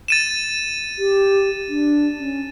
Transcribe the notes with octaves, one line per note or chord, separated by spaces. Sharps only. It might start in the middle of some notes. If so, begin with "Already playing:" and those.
A6 D#7 E7
G4
D4
C#4